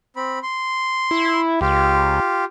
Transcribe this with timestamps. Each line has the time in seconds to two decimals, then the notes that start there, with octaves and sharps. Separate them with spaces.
0.16 C4 B5
0.43 C6
1.11 E4
1.61 C#2 F4 G4